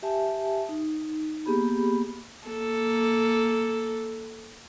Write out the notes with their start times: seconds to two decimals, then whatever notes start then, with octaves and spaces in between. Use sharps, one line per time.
0.02 G4 E5 G#5 A5
0.69 D#4
1.46 A#3 B3 G4 G#4 B5
2.47 A#3 A4